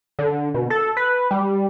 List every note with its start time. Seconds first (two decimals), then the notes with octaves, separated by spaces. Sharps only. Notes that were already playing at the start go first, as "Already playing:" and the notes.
0.19 D3
0.54 B2
0.70 A4
0.97 B4
1.31 G3